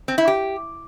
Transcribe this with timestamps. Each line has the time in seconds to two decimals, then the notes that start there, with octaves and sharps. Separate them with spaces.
0.08 C4
0.18 E4
0.27 G4